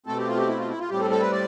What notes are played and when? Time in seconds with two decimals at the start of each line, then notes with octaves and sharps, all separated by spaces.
0.06 B2 A3 C4 A4
0.17 G4
0.27 F4
0.37 G4
0.47 E4
0.58 F4
0.68 E4
0.79 F4
0.90 A2 G3 C4 G4
1.00 A4
1.10 A4
1.21 B4
1.32 D5